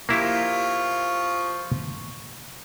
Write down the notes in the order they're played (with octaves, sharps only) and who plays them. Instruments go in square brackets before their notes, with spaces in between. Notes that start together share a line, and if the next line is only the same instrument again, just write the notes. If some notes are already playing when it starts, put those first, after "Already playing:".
[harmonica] F3 F4 C#6 [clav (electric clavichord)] A#3 E4 G4